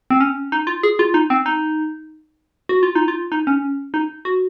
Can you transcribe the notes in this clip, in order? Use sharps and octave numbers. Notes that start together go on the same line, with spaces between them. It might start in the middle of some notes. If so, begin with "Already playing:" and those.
C4
C#4
D#4
F4
G#4
F4
D#4
C4
D#4
F#4
F4
D#4
F4
D#4
C#4
D#4
F#4